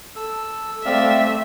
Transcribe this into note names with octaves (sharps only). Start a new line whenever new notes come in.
A4 E6
A3 C4 D5 E5 F5